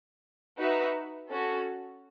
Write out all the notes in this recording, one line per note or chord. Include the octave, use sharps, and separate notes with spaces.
D#4 F#4 B4 E5
C#4 F#4 A4